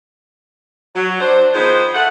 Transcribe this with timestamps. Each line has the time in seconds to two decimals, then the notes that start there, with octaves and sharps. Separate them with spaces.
0.95 F#3
1.20 D4 C5
1.54 D#3 F3 B3 D#4 G#4 C5
1.95 A3 F#5